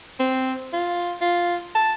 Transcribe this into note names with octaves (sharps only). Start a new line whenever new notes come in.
C4
F4
F4
A5